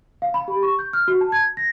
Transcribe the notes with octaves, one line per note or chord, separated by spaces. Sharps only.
F5
B5
G4
C#6
G6
F6
F#4
A5
G#6
A#6